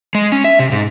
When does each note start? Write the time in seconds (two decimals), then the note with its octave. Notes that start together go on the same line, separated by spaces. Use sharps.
0.15 G#3
0.32 C#4
0.44 E5
0.59 C3
0.72 G#2